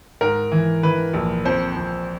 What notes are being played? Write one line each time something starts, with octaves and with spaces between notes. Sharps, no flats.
G#2 A#4
E3
E3 B4
A#1
F2 C5
F2